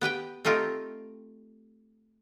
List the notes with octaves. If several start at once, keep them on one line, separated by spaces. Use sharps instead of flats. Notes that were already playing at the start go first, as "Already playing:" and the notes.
B3 G4 B4 G5
A3 C4 D#4 F4 G4